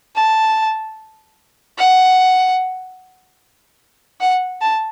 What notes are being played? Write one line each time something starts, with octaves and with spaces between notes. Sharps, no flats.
A5
F#5
F#5
A5